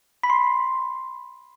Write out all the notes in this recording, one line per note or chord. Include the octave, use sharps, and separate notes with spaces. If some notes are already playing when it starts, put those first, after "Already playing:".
B5
C6